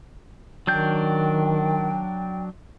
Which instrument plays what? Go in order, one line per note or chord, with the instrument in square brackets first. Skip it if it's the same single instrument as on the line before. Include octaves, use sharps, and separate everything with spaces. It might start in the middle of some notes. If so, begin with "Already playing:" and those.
[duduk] D#3 [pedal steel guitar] F#3 D4 G6 [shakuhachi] G5